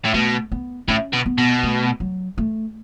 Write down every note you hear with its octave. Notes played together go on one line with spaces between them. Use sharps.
A2
B2 A3
B3
A2 C#4
B2
B3
B2
A3
F#3
A3